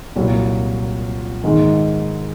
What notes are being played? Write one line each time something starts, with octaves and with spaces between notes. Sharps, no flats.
C2 A#2 F#3
G#2 D#3 G#3